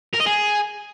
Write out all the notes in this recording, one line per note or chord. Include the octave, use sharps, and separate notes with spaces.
A#4
D#5
G#4